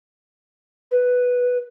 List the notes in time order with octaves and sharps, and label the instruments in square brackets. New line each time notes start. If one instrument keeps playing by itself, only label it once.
[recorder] B4